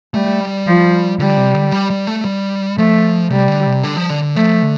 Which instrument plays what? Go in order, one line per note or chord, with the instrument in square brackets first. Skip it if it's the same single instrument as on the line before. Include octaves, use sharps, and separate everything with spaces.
[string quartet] G3 [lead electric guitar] A3
[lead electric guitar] G3
[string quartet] F3
[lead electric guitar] D3 [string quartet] G3
[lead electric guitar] C3
D3
G3
G3
A3
G3
[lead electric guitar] F3 [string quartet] A3
[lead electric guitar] C3 [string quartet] G3
[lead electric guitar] D3
C3
D3
F3
D3
D3
[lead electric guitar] F3 [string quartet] A3
[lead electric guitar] D3